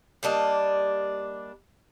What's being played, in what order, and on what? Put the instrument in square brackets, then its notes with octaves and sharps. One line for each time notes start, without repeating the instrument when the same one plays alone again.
[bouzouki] G3 A#3 D4 D#5